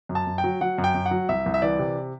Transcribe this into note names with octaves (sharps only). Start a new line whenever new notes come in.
F#2
A5
F#2
G5
F#3
F#3 F#5
F#2
G5
F#2
F#5
F#3
C2 E5
C2
E5
E3 D5
C3